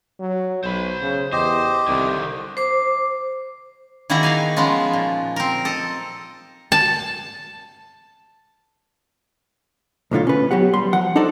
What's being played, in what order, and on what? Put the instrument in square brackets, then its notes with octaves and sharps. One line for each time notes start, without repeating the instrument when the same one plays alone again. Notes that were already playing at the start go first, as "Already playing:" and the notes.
[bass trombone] F#3
[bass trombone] B1 [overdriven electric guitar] C5 B5
[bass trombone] C#3
[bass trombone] E2 [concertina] G4 D#5 [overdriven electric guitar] C5
[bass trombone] C2 [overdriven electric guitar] D3 D#3
[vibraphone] C5 D6
[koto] D#3 A#3 E4 F#4 G#4 A#5
B3 D#4 F5 G#5
F3 G#3 B3 C#4 F4
A#2
C4 A#4
A4 D#5
A5
[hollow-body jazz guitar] B1 A2 D3 F4
C#4 B4
F#3 B3 G4 F#5
G3 C6
F3 F#5
D4 D#4 A4 C5 D5